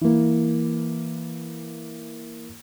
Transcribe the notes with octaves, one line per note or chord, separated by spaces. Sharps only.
E3 A#3